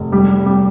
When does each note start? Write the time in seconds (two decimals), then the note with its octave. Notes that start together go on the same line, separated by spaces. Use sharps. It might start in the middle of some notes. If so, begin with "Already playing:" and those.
Already playing: F1
0.12 G3
0.46 G3